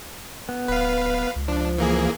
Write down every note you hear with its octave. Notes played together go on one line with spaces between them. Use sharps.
B3
D1 B4 F5
C#2
F3 D4
E3 A#3 G#4